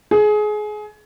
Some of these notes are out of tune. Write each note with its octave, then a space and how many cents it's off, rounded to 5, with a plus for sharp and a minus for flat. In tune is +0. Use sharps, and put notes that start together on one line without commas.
G#4 +25